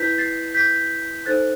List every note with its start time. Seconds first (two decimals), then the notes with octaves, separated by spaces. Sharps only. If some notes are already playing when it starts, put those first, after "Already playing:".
Already playing: E4 B4 G6 B6
0.18 A6 C7
0.54 G6 B6
1.26 D#4 A4 C5 F#6 A6